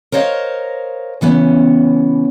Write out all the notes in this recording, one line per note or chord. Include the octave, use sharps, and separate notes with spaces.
A#4 C5 C#5 D#5 F5
C#3 E3 B3 C#4